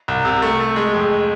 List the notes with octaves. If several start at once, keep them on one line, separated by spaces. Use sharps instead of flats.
C2
C3
A3
A3
G#3
F2